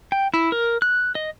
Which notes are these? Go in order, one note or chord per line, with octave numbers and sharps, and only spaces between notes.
G5
E4
A#4
F#6
D#5